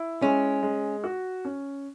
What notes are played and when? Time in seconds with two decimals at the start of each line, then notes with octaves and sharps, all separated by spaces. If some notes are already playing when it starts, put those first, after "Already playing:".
Already playing: E4
0.22 G#3 C#4
0.63 G#3
1.04 F#4
1.45 C#4